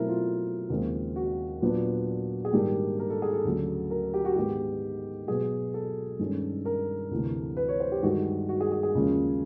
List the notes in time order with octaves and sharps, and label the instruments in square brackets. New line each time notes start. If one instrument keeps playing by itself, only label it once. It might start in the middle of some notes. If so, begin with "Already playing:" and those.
Already playing: [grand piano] B2 F#3 A3 C4 E4 A#4
F4
D#2 C#3 F3 G#3 C4
F#4
A#2 F#3 B3 D4
G#4
G#2 D#3 G3 A#3 D4 G4
A#4
A4
G#4
A4
D2 C#3 F#3
A#4
G4
F#4
G#2 D#3 G#3 B3 G4
B2 F#3 B3 G#4
A4
G2 D#3 G#3 C#4
A#4
D2 C3 E3 A3
B4
C#5
C5
G4
G2 D#3 G#3 F#4
F#4
G#4
G#4
G#4
D#2 C#3 F3 G#3 C#4